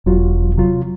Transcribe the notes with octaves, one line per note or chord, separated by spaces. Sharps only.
E1 F#3 F4 F#4
C3 F#3 F4